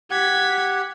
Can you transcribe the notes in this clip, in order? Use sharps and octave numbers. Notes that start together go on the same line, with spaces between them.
G4 F#5 G#6 B6